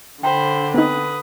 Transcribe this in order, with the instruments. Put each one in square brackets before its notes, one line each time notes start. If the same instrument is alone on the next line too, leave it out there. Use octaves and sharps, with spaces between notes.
[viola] D3 [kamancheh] C5 B5 [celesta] G5
[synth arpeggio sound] B3 C4 D#4 [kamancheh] B4 D#6